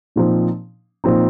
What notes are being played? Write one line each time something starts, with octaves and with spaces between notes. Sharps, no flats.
A#2 F3 C4 D#4
A#2 F3 C4 D#4